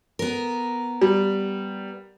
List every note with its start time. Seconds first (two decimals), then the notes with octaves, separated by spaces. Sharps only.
0.19 B3 A#4
1.01 G3